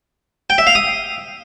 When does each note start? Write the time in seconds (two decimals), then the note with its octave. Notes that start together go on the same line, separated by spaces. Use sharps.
0.50 G5
0.58 E5
0.67 F5
0.75 D#6